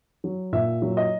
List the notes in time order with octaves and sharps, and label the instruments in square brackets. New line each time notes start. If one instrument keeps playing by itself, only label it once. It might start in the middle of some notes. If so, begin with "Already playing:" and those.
[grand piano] F#3
A#2 E5
F#3
D#5